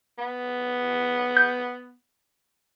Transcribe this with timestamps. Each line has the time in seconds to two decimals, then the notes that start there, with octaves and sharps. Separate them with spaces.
0.18 B3
1.37 G6